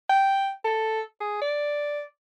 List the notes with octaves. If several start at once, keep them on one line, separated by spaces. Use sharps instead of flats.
G5
A4
G#4
D5